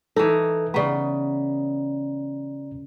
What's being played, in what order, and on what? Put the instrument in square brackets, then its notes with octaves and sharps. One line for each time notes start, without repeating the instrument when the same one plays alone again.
[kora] E3 D#4 [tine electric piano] A4
[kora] C#3 B3 [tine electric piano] D5 A#5